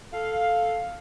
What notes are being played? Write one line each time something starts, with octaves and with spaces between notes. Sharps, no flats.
A4 F5